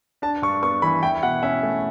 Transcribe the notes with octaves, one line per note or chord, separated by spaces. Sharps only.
D4 A5
G2 C#6
B3 C#6
E3 B5
E4 G5
B2 F#5
C#4 E5
A3